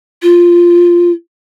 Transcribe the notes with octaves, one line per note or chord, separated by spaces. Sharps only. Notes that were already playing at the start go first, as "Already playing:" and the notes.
F4